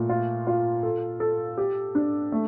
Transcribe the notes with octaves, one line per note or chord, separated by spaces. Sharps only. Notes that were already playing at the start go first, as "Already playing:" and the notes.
Already playing: A#2 A3
F4
F4
A4
A4
G4
D4
A3